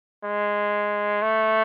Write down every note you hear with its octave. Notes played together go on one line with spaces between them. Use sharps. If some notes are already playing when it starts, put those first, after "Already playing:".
G#3
A3